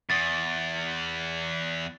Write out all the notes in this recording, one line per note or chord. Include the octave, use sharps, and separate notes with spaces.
E2 A6